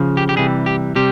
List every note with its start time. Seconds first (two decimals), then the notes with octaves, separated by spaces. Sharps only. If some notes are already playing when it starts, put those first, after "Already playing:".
Already playing: C#3 F3
0.17 G4
0.29 G4
0.36 C3 E3 G3 G#4
0.66 G4
0.96 C3 G3 G4